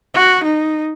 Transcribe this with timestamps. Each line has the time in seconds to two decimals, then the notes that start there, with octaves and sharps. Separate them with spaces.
0.14 F#4
0.44 D#4